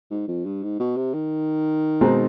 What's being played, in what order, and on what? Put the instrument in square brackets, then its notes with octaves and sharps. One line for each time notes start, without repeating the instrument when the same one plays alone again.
[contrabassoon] G#2
F2
G2
G#2
B2
C3
D#3
[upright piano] B2 G#3 C4 D#4